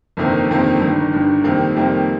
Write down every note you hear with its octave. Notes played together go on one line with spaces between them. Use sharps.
G1 F2 C3 D#3 A#3
G1 F2 C3 D#3 A#3
G1 G2 D#3
G1 G2 D#3
F2 C3 D#3 G3 A#3
F2 C3 D#3 G3 A#3